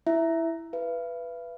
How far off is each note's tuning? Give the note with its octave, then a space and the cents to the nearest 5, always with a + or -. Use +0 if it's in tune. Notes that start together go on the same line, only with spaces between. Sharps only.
E4 +0 E5 +0
B4 +0 E5 +45